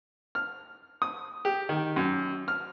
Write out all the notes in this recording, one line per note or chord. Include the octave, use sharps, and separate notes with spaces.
F6
D#6
G4
D#3
F#2
F6